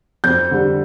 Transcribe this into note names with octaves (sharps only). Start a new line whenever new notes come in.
F2 G6
D3 G3